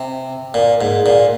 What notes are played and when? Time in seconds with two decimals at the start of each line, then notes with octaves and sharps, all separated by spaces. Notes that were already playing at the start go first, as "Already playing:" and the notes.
Already playing: C3
0.54 A#2
0.81 G#2
1.06 A#2